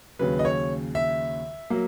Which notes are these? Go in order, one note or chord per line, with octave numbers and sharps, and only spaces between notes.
D#2 C#3 F#3 B4
D#5
C#5
E5
F#3 A#3